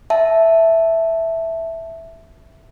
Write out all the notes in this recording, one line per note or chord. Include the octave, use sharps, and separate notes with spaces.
E5 A5